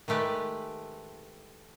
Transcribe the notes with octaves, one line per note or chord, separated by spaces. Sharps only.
D#3 G#3 A3 G4 B4